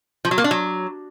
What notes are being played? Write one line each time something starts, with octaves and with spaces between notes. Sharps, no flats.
F3
F#3
A#3
D4
F#3